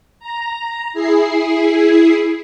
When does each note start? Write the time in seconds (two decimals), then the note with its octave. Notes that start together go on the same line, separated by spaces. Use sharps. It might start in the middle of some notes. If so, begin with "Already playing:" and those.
0.19 A#5
0.93 E4 G#4 C7